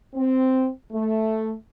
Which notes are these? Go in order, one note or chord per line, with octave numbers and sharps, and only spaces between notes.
C4
A3